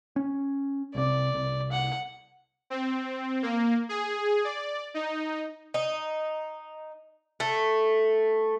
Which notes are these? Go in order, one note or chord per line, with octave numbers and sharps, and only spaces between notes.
C#4
C2 C3 D5
C2
F#5
C4
A#3
G#4
D5
D#4
D#4
A3